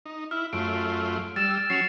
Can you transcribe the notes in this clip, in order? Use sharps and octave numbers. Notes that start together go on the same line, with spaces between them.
D#4
E4 F6
F#2 A3 F4 D7
G3 E6 A6 E7
F#3 C#4 C7 C#7 F7